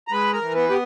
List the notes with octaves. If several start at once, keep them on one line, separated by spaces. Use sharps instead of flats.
A#5
G#3 B4 B5
A#4 A#5
E3
B3 B4
B3 G4